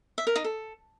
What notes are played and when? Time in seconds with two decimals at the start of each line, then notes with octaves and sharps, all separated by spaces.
0.18 E5
0.27 A#4
0.36 D#4
0.44 A4